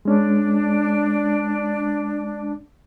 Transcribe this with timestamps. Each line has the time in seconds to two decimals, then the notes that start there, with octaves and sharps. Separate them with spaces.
0.05 G#3 C#4 D4